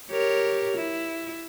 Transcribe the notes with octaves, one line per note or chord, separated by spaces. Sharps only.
G4 A#4 C#5
E4